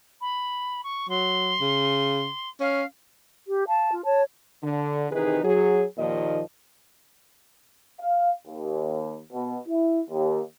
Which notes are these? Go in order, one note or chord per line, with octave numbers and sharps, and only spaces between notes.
B5
C#6
F#3 C6
C#3
C#4 F5
G4
F5 A5
F4
C#5 A5
D3
C3 D#3 E3 D#4 G#4 B4
F#3 G#4
D#2 A#2 D#3 F3 D#5
F5
D#2
B2
E4
D#2